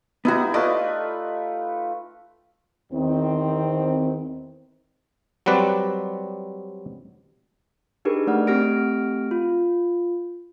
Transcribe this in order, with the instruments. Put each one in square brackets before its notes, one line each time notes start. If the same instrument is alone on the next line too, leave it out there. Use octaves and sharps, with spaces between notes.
[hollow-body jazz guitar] B3 F#4 [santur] D#4 E4 G4
[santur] A3 F4 B4 [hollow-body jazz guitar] D5 D#5
[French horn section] E2 D#3 C4
[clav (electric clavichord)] F#3 G3 C4 B4 D5
[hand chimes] D4 D#4 G4 G#4 A#4 B4
A3 D5 F#5 F6
A3 C4 G4 F6 A#6 D7
F4